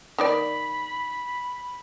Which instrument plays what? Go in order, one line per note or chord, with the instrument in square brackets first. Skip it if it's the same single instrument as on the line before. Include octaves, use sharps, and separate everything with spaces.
[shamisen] D#3 A#3 D5 [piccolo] B5